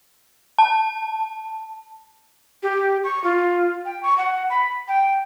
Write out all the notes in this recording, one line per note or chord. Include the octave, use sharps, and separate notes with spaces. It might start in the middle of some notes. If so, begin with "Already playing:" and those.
A5
G4
C#6
F4
G5
C#6
F#5
B5
G5